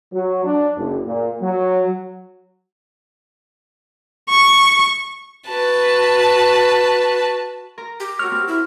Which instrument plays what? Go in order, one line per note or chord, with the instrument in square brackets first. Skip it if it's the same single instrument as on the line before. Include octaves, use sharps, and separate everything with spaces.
[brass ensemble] F#3
D4
F#1
A#2
F#3
[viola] C#6
[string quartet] F#4 B4 A5
[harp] A#4 A#5
[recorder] G4
[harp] F#4 A#4 C#5 [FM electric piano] F6
[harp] C4
[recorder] E4